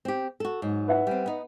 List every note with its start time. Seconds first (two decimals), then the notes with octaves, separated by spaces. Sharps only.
0.05 C4 G4
0.40 F#4 A4
0.62 G#2 F#3
0.88 B4 E5 F#5
1.07 G3 C4
1.26 B3 D#4